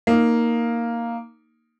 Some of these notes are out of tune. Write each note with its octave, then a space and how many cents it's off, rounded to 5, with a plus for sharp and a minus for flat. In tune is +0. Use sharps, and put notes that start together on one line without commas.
A#3 +0 D#4 +0